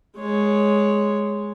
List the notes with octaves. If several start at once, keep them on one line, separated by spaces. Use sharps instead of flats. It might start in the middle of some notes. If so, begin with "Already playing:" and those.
G#3 C#5